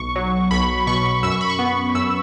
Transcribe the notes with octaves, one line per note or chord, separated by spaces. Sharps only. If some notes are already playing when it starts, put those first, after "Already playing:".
Already playing: B1 C#6
F#3
B1 B5
B2 C#6
F#2 E6
C#6
B5
C#6
B3
F#2 E6